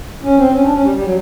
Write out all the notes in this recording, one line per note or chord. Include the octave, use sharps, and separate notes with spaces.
C#4
C4
C#4
D4
C#4
G3
G3
F#3